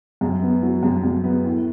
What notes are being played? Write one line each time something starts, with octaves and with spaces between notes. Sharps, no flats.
F#2
B3
F#3
F#2
F#2
B3
A2